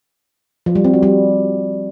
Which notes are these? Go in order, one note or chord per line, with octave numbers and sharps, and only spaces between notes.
F3
G3
C4
F#4
G3